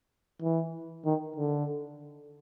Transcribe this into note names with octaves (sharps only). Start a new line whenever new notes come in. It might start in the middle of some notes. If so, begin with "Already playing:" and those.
E3
D#3
D3